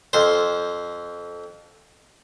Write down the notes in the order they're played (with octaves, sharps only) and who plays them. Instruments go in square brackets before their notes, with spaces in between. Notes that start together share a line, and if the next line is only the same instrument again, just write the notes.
[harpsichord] F2 C5